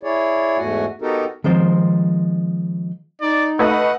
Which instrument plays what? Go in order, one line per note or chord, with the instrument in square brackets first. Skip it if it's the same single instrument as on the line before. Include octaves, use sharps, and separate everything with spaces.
[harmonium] E4 G#4 C#5 D5
E2 G#2 A3 F#4 F#5 G#5
B3 D#4 F#4 G4 A4 A#4
[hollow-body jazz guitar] D#3 F3 G#3 C4 C5
[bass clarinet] D#4 [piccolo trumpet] D5
[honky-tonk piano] A3 B4 D#5 [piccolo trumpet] F#5